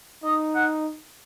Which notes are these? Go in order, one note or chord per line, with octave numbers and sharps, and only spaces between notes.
D#4 D#5
F#5